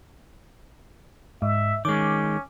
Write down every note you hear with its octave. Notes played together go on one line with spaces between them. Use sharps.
G#2 E5
D#3 G#3 C#4 D6